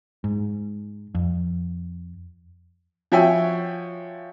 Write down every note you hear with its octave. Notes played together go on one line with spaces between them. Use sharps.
G#2
F2
F3 F#4 C#5 E5 G5 G#5